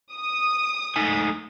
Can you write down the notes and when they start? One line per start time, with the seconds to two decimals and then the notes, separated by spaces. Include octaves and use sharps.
0.13 D#6
0.96 A3 D#4 G#5